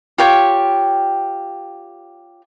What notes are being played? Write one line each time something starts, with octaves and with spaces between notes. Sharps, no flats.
F4 G4 C#5 G5